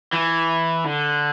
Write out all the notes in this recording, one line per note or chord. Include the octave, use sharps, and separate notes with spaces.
E3
D3